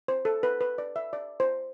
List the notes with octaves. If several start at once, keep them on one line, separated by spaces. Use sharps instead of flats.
C5
A4
B4
B4
D5
E5
D5
C5